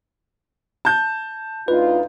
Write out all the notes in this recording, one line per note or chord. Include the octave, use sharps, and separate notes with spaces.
A5 G6
D2 D#4 F4 B4